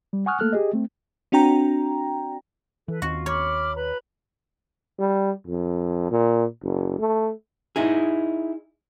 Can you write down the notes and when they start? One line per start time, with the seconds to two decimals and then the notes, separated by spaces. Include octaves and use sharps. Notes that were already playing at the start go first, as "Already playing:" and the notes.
0.13 G3
0.26 F#5 G#5 C#6 D#6 F6 F#6
0.40 A3 A#3 A4 F6 F#6
0.53 G4 G#4 D#5
0.74 A3 C4
1.32 C4 D4 F#4 G5 A#5
2.88 E3 A4 B4
3.02 D#2 D#3 C4 F4 F#4
3.26 C#5 B5 D6 F6
3.75 B4 A#5 B5
4.99 G3
5.47 F2
6.11 A#2
6.63 F#1
6.99 A3
7.76 D#4 E4 G#4